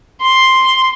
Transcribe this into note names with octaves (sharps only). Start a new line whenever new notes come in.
C6